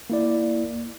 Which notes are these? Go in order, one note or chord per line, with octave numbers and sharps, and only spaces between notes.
A#3 E4 D5